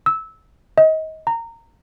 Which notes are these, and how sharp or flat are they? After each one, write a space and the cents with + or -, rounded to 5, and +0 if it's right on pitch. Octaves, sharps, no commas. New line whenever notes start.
E6 -15
D#5 +25
A#5 -20